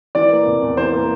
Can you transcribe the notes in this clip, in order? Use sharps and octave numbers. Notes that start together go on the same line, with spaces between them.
E3 D5
A#3
F1
E2
E3 C5
A#3